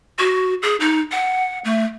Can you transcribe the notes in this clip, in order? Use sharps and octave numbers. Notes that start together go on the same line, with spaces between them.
F#4
G#4
D#4
F#5
A3